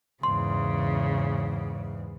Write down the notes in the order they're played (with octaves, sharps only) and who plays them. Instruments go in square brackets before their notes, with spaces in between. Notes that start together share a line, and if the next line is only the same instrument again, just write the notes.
[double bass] E2 G#2 [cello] C#3 [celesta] C6